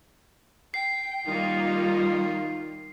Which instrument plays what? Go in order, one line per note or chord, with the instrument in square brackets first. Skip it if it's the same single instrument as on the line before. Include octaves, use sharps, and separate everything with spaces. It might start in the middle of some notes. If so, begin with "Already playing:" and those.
[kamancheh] G5 [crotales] C7
[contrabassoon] D#3 [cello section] G3 F4 [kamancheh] A#3 D#4